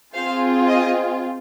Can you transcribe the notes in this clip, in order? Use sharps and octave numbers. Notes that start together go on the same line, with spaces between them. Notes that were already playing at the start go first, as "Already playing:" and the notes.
C4 F4 G#4 C5 F5
D#5